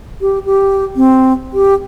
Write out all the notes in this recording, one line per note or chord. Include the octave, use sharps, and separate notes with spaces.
G4
G4
C4
G4